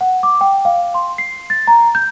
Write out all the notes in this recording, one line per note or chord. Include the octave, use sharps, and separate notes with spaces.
F#5
D6
G5
F5
C6
C7
A6
A#5
G6